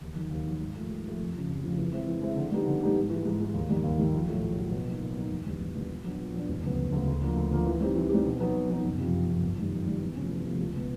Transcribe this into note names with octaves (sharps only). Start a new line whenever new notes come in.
D#2
D#3 F#3
D#2
D#3 F#3
G#2
F3 A3
G#2
F3 A3
F1
F2 C#3
F1
F2 C#3
E3
G#3 C4 E4
E3
G#3 C4 E4
D3
G3 B3 D#4 G4
D3
G3 B3 D#4 G4
G#2
E3 G#3
G#2
E3 G#3
D#2
D#3 G3 A#3
D#2
D#3 G3 A#3
A#1
A2 F#3 A3
A#1
A2 F#3 A3
B2
F#3 A#3 D#4
B2
F#3 A#3 D#4
E1
D#2 D3 G3 B3
E1
D#2 D3 G3 B3
A#2
F#3 B3 D4
A#2
F#3 B3 D4
E1
D2 C#3 F#3 B3
E1
D2 C#3 F#3 B3
D2
D3 F3 A#3
D2
D3 F3 A#3
E3
G3 C4 D#4 G4
E3
G3 C4 D#4 G4
B2
F#3 B3 D#4
B2
F#3 B3 D#4
F#1
F2 C3
F#1
F2 C3
G1
F#2 D#3 G3
G1
F#2 D#3 G3
E2
C3 F3 A3 C#4
E2
C3 F3 A3 C#4
C#2
B2 G#3 B3